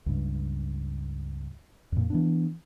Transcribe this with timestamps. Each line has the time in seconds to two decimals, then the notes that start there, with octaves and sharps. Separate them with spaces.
0.06 C#2 G2
1.92 F2 A#2
2.10 E3 B3 D4